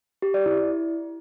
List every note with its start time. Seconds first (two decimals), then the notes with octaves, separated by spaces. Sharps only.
0.22 G4
0.34 D5
0.46 E4